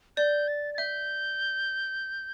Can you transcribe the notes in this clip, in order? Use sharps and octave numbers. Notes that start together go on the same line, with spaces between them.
D5 G6
A6
A6
E5 G6